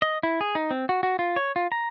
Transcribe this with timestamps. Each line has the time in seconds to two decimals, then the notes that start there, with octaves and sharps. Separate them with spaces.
0.02 D#5
0.23 E4
0.41 G#4
0.55 D#4
0.71 C4
0.89 F#4
1.03 F#4
1.19 F4
1.36 C#5
1.56 F4
1.72 A#5